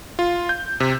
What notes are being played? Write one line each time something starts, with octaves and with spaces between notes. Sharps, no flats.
F4
G6
C3